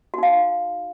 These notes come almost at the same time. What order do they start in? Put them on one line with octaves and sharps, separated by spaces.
F#4 D#4 F5